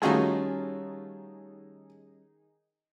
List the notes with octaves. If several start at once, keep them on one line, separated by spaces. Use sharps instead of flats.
D#3 G3 A3 C#4 D#4 F4 F#4 G#4